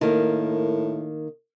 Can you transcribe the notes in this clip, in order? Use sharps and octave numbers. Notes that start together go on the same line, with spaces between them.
A2 D#3 A#3